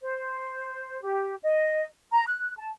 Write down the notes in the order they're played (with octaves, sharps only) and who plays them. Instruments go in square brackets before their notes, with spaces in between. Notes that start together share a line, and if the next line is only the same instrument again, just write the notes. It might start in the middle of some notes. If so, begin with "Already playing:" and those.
[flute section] C5
G4
D#5
A#5
F#6
A5